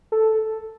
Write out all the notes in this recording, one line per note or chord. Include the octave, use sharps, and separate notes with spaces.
A4